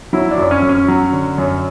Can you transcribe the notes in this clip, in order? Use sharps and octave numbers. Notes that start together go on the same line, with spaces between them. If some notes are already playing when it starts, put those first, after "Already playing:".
F#3 E4
D4
F#2
C#4
F#2
C#4
F#3
D3
F#2